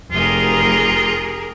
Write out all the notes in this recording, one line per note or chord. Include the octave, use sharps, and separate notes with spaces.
F1 F4 G4 G#4 A#4